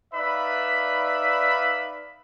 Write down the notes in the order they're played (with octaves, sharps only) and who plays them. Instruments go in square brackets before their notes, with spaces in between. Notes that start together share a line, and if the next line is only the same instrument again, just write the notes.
[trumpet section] D#4 B4 D5 E5 F5 B5